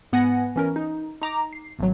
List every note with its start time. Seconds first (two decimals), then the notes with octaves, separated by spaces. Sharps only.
0.12 G#2 B3 F#5 G#5 A#6
0.56 E3 C#4 A#4
0.76 D#4
1.22 D#4 A#5 D6
1.53 C7
1.79 G#1 F#3